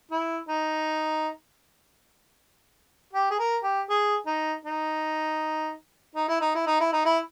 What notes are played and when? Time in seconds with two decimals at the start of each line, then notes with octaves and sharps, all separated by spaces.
0.11 E4
0.48 D#4
3.13 G4
3.30 G#4
3.39 A#4
3.63 G4
3.89 G#4
4.26 D#4
4.65 D#4
6.15 D#4
6.28 E4
6.41 D#4
6.55 E4
6.66 D#4
6.80 E4
6.93 D#4
7.05 E4